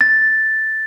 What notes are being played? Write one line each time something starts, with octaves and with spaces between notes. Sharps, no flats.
A6